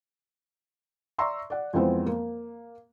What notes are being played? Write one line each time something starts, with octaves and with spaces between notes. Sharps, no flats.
D5 E5 A#5 C6 C#6 E6
D5 F#5
F2 E3 G#3 B3 C4 C5
A#3